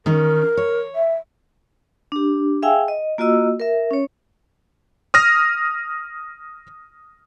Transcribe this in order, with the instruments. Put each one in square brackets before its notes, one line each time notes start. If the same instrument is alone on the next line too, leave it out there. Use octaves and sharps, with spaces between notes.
[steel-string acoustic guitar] D#3 C#4 D#4 [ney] A#4
[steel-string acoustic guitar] C#5
[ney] E5
[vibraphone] D4 G4
G#4 E5 F5 G5 G#5 E6
D#5
A#3 F4 F#4 D#5 E6
A#4 E5
C#4 C#5
[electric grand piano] D#6 F6 A#6